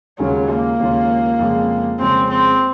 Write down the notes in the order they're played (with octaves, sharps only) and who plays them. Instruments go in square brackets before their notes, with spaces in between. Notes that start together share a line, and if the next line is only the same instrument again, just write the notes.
[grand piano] D#2 C#3 G#3 C#4 F4 [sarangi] F#3
[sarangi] A#3
[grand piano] D#2 C#3 G#3 C#4 F4
F2 C#3 G#3
[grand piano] F2 C#3 G#3 [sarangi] C4
[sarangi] C4